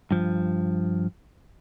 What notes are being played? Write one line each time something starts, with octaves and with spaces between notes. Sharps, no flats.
G2 F3